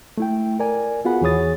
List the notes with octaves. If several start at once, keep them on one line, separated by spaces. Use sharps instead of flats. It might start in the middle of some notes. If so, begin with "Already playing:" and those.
A3 E4 G5
A#4 D5 G#5
B3 F4 F#4 G#4 F#5 B5
E2 E3 G#4 C#5 D#6 A6